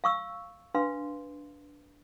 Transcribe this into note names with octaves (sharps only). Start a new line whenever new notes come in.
F5 C#6 E6
D4 B4 F5 C6